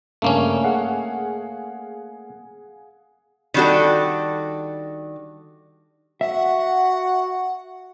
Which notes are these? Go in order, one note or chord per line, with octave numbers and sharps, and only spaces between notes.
G2 C#3 A3 A#3 C#4
G#4 F5 F#5
D#3 G3 D4 F#4 A4
F#4 E5 F#5